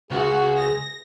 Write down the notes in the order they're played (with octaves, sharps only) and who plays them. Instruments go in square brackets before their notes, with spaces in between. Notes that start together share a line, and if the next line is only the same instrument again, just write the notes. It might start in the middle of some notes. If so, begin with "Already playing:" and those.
[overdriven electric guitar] C#2 [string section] F#4 [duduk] G#4
[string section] A#6